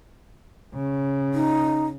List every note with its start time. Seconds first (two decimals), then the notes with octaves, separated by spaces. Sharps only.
0.75 C#3
1.34 D#4